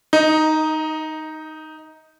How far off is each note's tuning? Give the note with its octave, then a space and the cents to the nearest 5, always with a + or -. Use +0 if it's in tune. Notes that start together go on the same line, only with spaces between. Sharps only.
D#4 +0 D#5 +25